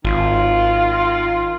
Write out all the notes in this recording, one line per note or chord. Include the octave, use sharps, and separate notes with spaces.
G#1 D#3 F4